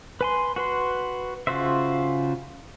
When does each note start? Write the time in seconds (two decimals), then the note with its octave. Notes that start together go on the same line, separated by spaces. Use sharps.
0.21 B4 G#5 C6
0.56 F#4 B4 C6
1.47 C#3 F4 F#4 C5 E5